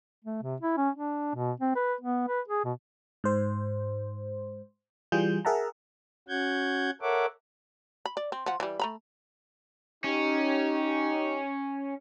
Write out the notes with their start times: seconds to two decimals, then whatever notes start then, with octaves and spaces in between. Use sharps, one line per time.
0.25 A3
0.42 C3
0.61 E4
0.77 C#4
0.95 D4
1.35 B2
1.60 C4
1.75 B4
2.01 B3
2.28 B4
2.48 G#4
2.65 B2
3.24 G#2 C5
5.12 E3 G3 F4 G#4 G6
5.45 G#4 A#4 E5 F#5 A5 A#5
6.28 C#4 F#4 F#5 G6 G#6
7.02 A4 A#4 C#5 E5 F#5 D6
8.05 B5
8.17 D5
8.32 C4
8.46 F3 F#5
8.60 E3 G3
8.79 A3 A#5 B5
10.04 C#4 D#4 G4